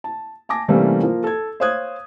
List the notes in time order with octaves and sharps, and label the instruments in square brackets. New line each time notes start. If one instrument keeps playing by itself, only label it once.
[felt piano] A5
G#5 A5 D6 A#6
C3 E3 G3 A3 A#3 C#4
F3 A#3
A4 G#6
C5 C#5 F5 D#6 F#6 G#6